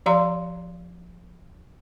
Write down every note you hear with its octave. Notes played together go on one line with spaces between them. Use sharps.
F3 G4 D5 F5 A#5 C6